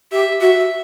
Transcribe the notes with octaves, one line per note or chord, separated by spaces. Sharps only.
G4 E5
F#4 E5